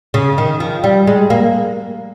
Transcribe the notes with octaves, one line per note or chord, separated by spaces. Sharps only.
C#3
D#3
F3
G3
G#3
A#3